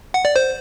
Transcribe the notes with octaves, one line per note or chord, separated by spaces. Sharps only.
F#5
D5
C5